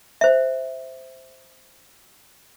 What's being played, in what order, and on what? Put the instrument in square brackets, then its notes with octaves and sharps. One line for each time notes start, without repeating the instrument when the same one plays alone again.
[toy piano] C5 E5